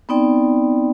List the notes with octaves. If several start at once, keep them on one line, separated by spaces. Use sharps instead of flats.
B3 C4 D#4 D5 G5